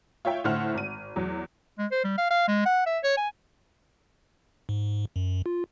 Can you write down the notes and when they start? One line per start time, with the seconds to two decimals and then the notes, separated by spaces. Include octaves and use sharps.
0.25 F4 C#5 E5 G5
0.44 A2 D3 A3 C5 F#5 F6
0.74 G#1 D#7
1.16 E2 F#3
1.79 G#3
1.92 C5
2.04 G3
2.18 F5
2.31 F5
2.48 G#3
2.66 F#5
2.86 E5
3.04 C#5
3.17 G#5
4.69 G#2
5.16 F#2
5.46 F4